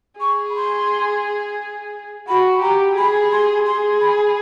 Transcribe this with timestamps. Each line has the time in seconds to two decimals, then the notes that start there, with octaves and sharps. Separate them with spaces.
0.20 G#4 C#6
0.50 B5
0.56 C6
2.28 F#4 B5
2.62 G4 A#5
2.96 G#4 B5
3.31 C6
3.66 G#4 C6
4.00 B5